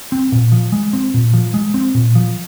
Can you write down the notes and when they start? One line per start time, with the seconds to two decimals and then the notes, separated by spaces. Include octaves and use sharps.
0.12 C4
0.32 A#2
0.52 F3
0.72 G#3
0.93 C4
1.14 A#2
1.34 F3
1.54 G#3
1.74 C4
1.95 A#2
2.15 F3